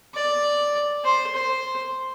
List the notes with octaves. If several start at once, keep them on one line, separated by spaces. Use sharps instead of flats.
D5
C5
C5